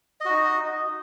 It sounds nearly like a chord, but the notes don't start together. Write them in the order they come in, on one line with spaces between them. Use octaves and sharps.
D#5 F#4 D#4